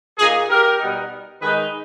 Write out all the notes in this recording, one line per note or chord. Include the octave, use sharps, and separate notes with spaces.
A#2 A#3 D#4 G#4
G4 A#4
B2 G3 B3 D#4
D#3 G#3 D#4 G#4 B4